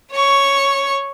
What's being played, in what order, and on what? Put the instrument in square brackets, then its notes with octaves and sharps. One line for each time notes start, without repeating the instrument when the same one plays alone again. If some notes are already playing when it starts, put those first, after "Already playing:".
[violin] C#5 C#6